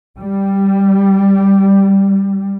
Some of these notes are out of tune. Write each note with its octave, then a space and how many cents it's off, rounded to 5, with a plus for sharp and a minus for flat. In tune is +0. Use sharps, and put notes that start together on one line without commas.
G3 +0